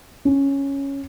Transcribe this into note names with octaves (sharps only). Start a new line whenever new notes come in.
C#4